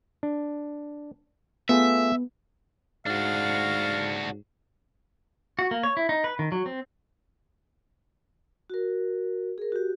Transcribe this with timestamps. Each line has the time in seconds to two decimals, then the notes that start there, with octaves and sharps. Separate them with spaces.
0.23 D4
1.69 A3 B3 F4 G#4 E5
3.06 G#2 D4 F#4 F5
5.59 F#4
5.71 A#3
5.83 C#5
5.97 E4
6.09 D#4
6.24 B4
6.39 D#3
6.52 F#3
6.66 C4
8.70 F#4 A#4
9.58 G#4 A#4
9.72 F#4 G4